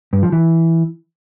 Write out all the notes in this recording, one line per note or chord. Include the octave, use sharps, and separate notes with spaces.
G2
F3
E3